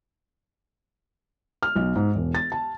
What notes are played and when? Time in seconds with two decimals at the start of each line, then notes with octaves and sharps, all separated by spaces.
1.63 F6
1.76 B1
1.95 G#2
2.16 E1
2.35 A6
2.52 A5